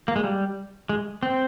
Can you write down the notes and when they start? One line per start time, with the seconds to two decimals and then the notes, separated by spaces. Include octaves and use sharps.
0.08 A#3
0.16 G#3
0.24 G3
0.89 G#3
1.23 C4